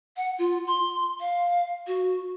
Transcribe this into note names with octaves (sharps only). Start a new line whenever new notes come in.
F#5
F4
C6
F5
F#4